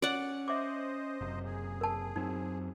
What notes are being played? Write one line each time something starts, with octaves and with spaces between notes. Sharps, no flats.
C#4 D5 F#5
C5 D#5 E5 D6
F#1 F#2 C3
G#4
A#4 A5
F#2 F#3 C4 D#4